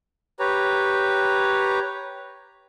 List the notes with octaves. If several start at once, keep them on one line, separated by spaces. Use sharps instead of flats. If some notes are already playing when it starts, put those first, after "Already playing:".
G4 B4 C#5 A#5